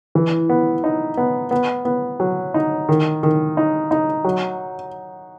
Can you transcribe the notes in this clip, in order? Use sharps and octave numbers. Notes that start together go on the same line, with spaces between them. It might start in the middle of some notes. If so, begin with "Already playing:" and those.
E3
B3
D#4
B3
B3
B3
F#3
D#4
D#3
D#3
D#4
D#4
F#3